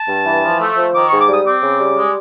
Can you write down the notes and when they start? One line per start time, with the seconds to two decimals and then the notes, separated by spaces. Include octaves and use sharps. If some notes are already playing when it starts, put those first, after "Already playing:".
Already playing: A5
0.08 G2
0.26 E3
0.43 F3
0.60 A3
0.77 F3
0.94 D#3 D6
1.07 G#2 C#6
1.20 D6
1.29 G3 D#6
1.46 C4 D6
1.63 C#3
1.80 G3
1.97 G#3